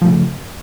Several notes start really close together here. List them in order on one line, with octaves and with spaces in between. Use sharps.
F3 A3 C#3